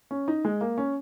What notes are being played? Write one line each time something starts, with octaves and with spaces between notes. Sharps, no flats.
C#4
D#4
G#3
A#3
C#4